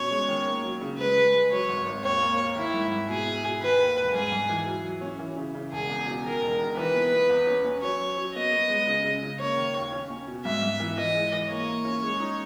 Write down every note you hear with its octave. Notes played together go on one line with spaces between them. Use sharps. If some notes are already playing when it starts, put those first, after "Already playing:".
Already playing: B2 C#4 C#5
G#3
D#3
A#3
F#3
C#3
G#3 B4
G#3
G#3
F#3 C#5
G#1
G#1
D#2 C#5
A#3
A#3
D#3 E4
G#2
G#2
B2 G#4
E4
B2
D#3 B4
D#2
E1
G#2 G#4
G#2
E3
F#3
F#3
C#4
E3
C#3
C#3
E1 G#4
E2
B2
D#3 A#4
E1
D#3
E3 B4
B3
B3
E2
C#4
C#4
F#3 C#5
F#3
F#3
B3 D#5
B3
G#3
C#3
C#3
C#3
A#3 C#5
D#3
D#2
C#4
C#4
B2
G#2 E5
G#2
E3
E3 D#5
G#3
E3
A#3 C#5
A#3
C#4
G#3
D#4